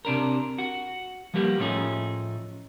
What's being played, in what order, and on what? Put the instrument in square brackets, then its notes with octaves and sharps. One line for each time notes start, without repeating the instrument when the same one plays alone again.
[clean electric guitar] C3 D4 A#4
F#4
F3 G3 A#3 B3 G4
A2 F3 A3 C#4 D#4 G#4